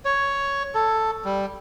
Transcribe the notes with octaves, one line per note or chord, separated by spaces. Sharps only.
C#5
A4
G3